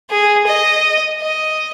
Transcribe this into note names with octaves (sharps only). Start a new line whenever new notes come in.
G#4
D#5
D#5